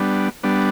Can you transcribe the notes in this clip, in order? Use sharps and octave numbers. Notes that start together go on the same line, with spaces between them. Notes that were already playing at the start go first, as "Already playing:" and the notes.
Already playing: G3 B3 D4
G3 B3 D4